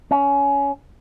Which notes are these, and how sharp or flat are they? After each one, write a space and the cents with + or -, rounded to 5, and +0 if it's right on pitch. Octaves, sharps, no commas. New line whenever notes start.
C#4 +20